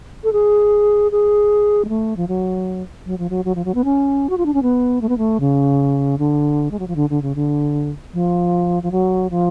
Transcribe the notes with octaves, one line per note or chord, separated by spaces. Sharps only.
A4
G#4
G#4
G#3
A3
F3
F#3
F#3
F3
F#3
F#3
F3
F#3
B3
C#4
F#4
F4
D4
C#4
B3
A3
B3
A3
C#3
D3
G#3
F#3
F3
D3
D3
C#3
D3
F3
F3
F#3
F3